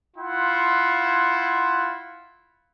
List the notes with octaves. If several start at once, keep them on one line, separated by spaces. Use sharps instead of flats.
E4 F4 F#5 C6